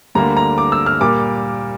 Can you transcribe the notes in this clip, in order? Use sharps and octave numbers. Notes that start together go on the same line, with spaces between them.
D2 D3 G3 A#3 A#5
A#5
D6
E6
F6
A#2 G3 A#3 D6